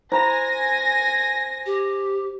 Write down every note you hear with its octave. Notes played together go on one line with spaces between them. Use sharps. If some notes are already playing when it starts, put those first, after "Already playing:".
E4 C5 G#5 A#5 B5 A#6
G4